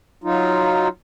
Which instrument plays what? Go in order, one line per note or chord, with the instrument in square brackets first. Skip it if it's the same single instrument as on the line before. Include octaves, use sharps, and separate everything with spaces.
[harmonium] F#3 D#4 F4